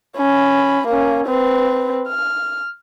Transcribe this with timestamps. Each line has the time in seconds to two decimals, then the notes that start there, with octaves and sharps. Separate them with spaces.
0.17 C#4 B5
0.87 A#3 C#4
1.26 C4 B4
2.09 F6